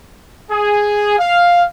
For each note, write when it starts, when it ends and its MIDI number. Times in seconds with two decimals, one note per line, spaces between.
0.51 1.15 68
1.19 1.64 77